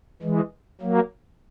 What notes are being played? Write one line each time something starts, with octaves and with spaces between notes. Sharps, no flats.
E3 G#3
F#3 A#3